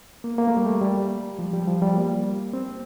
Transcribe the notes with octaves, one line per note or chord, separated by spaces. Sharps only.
A#3
A#3
A3
G3
A3
G3
F3
G3
F3
G3
A#3
C4